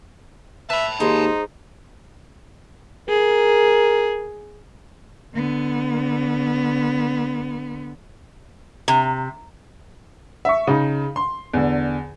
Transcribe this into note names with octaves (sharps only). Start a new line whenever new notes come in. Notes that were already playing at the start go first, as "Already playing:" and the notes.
B4 E5 A5 B5
D#2 G#3 D#4 C5 A#5
G#4 A#4
D3 B3
C3
E5 C#6
C#3 D#4
C6
E2 D3